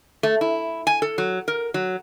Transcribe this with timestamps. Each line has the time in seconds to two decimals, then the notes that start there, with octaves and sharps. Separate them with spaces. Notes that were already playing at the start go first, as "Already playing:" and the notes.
0.23 A3
0.41 E4
0.87 G#5
1.02 A4
1.18 F#3
1.48 A#4
1.74 F#3